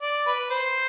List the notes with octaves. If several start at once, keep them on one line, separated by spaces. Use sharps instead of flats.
D5
B4
C5